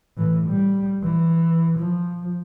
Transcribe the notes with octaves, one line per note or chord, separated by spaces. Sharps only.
A2 E3
G3
E3
F3